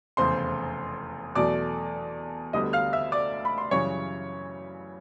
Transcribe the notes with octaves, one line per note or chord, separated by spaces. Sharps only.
F1 E2 C#3 C5 C6
E2 B2 F#3 A3 D5 D6
D2 D3 G3 B3 D#5 D#6
F5 F6
E5 E6
D5 D6
B5
C6
F#2 C#3 E3 G3 C#5 C#6